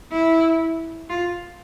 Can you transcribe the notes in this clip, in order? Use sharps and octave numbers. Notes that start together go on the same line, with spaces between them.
E4
F4